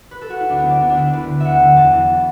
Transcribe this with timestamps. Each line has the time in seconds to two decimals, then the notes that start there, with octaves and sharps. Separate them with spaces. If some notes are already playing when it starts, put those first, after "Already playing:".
0.11 B4
0.21 A4
0.30 F#4
0.40 E4
0.49 D2 D4
0.59 B3
0.65 D3 D5
0.80 D2 B3
0.89 D4
0.97 D3 E4
1.13 D2 B4
1.28 D3
1.40 D2 E5 F#5
1.61 D3
1.76 E2 A5
1.93 E3